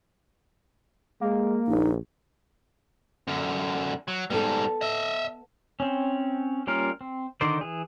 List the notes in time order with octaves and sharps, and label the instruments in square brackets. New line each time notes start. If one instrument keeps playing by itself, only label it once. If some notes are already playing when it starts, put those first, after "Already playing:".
[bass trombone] G#3 [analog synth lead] A#3
[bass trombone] A#1 [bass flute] D#4
[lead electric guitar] F#2 D3
F#3
[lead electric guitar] G#2 G3 [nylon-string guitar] B3 A4
[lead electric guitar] D#5 E5
[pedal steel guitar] C4 C#4
G3 A#3 C#4 F4 A#4
C4
D3 D#3 D#4 C5 D5
E3 G#4